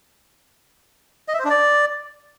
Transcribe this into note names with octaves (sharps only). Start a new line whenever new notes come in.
D#5
E5
C5
D4
D5